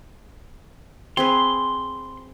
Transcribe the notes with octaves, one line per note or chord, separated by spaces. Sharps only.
C4 G#4 B4 C6